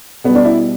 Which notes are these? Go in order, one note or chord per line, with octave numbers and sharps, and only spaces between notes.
B2 G3 B3
D4
E4